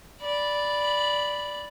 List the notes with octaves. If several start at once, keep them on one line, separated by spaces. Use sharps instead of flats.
D5 B5